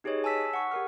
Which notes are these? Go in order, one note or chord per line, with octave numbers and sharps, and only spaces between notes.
D#4 G4 G#4 B4 C#5 D#5
G#5 A5 E6 B6
F#5 C#6
G4 A#4 F6